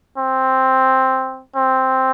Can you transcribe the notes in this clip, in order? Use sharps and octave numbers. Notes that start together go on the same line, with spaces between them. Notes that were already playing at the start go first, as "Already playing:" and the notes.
C4
C4